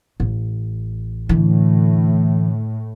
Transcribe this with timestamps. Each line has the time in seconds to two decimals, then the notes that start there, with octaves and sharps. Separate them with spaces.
0.20 A1
1.29 A2 D3 E3